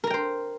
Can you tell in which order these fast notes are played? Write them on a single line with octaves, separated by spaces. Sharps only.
A#4 A#5 G5 C5